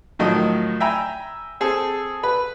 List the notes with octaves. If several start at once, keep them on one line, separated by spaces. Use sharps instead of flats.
A2 D#3 F3 F#3 D#5
E5 G5 G#5 A#5 B5
C4 G#4 A4
B4 B5